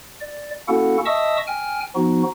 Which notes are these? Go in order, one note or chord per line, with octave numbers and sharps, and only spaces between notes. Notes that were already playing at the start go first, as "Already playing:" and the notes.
D5
A#3 C#4 E4 F#4 A4 F#5
D#5 E5 A5 C#6 D#6 E6
G5 G#5 F6
F3 B3 D#4 F#4